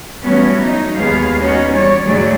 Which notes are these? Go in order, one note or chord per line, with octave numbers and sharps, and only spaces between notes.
E3 F#3 G3 A3 B3 C#4
F#3 D#4
D#2 G#3 B3 G#4 F5
B3 C#4 D#4 F#4
E3 G3 C#5 D5
D2 G#2 F#3 A3 G#4 D5